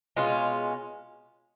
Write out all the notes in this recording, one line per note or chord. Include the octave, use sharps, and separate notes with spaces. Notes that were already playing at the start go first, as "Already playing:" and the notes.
B2 G#3 C#4 F4